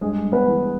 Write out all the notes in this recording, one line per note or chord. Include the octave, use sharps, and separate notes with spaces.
G2 G#3 G#4
G2
B3 B4
E3